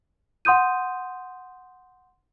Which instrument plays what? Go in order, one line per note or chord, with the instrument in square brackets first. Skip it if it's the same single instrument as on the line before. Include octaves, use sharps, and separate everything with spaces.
[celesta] F#5 C6 D#6 G6 D#7